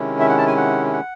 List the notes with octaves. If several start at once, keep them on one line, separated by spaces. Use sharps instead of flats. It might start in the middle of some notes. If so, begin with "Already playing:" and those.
Already playing: C3 D#3 G#3 C#4 E4
E5
F#5
A5
G#5
F#5
F#5